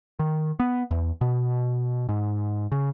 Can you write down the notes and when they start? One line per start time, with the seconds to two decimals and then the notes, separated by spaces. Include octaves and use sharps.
0.19 D#3
0.60 B3
0.91 E2
1.21 B2
2.09 G#2
2.72 C#3